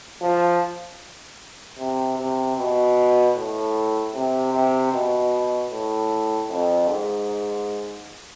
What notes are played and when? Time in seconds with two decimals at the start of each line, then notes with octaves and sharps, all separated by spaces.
0.22 F3
1.78 C3
2.17 C3
2.57 B2
3.36 A2
4.14 C3
4.53 C3
4.92 B2
5.71 A2
6.49 F2
6.88 G#2